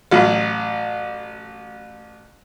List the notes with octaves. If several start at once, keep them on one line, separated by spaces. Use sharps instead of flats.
A1 F#3